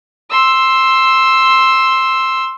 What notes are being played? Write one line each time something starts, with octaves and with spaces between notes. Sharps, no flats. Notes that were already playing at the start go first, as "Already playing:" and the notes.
C6 E6